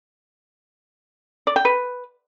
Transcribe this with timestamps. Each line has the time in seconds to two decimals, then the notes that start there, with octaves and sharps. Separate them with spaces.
1.47 D5
1.56 G5
1.65 B4